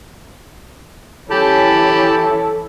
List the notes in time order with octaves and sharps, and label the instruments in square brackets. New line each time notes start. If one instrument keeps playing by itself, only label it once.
[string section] E3 C#4 E4 [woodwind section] G4 [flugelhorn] A4 [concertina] A5 B5